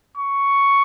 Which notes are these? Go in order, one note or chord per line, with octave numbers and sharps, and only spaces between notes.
C#6